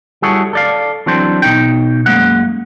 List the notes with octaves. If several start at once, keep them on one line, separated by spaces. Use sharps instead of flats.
G3 E4 F#4 G#4 A4 C#5
A4 D5 F5
E3 F#3 C4 D4 A4 C5
B2 D#4 G5
F#2 G#3 A#3 F#5